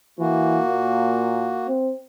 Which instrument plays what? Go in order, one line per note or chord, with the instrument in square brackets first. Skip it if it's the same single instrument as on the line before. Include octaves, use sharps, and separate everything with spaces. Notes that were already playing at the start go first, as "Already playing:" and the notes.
[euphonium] E3 [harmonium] A#3 F#4
[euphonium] A#2
C4